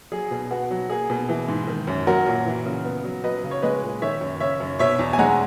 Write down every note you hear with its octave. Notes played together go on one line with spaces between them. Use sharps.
F#3 G#4
B2
B3 F#4
F#3
A#3 G#4
B2
E3
G#2
D#3
F#2
F#3 F#4 A#4
A#2
E3
C#3
B3
F#3
F#3 B4 D#5
C#3
C#5
G#3 B4 D#5
A#2
D#3 C#5 E5
F#2
C#3 C#5 E5
F#2
B2 C#5 E5
E2
G#5
G#3 F#5 A#5